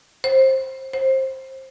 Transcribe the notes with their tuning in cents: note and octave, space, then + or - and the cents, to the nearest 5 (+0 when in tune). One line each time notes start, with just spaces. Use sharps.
C5 +20
C5 +20